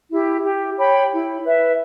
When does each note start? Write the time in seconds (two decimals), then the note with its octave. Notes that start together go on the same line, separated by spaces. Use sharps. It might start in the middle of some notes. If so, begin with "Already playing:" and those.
0.09 E4 G4
0.43 G4
0.77 C#5 G5 B5
1.11 E4
1.44 B4 E5